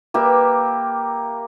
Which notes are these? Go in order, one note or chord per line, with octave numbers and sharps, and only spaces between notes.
A#3 G4 B4 E5